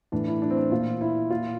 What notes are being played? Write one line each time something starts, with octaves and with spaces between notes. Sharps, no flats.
A2 E3 D4
E4
D4
C4
D4
A#2 F4
E4
A#2 F4